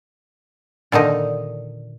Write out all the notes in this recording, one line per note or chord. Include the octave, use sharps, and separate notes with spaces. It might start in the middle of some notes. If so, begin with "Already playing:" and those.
A#2 D3 D#3 D#4